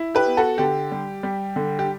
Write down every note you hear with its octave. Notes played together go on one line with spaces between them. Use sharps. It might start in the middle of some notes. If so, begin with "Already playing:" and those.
Already playing: E4
G4 B4
B3
F#4 A4
D3 G4
G3
G3
D3
G4